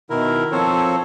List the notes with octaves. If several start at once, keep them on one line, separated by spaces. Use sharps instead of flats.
B2 D#3 E4 A#4
F3 C4 A4 C5 C#5